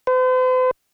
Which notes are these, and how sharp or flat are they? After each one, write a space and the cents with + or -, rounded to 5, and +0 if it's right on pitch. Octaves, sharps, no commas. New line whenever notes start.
C5 -45